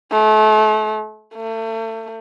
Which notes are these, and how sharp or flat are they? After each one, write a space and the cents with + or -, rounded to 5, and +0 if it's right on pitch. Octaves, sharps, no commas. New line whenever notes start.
A3 -35
A3 +35